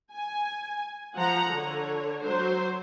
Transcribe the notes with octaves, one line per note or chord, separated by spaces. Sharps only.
G#5
F3 F#5 A#5
D3 C#5
F#3 C5